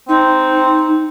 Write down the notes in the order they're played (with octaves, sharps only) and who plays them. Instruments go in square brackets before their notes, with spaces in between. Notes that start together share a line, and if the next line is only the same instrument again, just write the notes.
[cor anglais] C4 [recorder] D#4